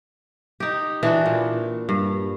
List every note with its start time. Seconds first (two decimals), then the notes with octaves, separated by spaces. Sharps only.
0.60 D#4 G4
1.03 E3 D4 F#4
1.26 A#2
1.89 G2